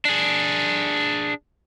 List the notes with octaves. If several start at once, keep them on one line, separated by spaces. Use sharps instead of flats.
D4 G#4